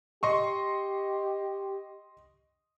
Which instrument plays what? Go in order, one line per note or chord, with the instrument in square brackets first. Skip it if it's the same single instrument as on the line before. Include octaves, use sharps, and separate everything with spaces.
[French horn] G4 [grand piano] D#5 C6 C#6